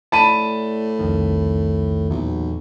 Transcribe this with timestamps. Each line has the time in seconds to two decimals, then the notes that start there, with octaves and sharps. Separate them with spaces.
0.12 A2 D5 A5 B5 D#7
0.99 C2 F2 D#3
2.10 B1 E2 A#2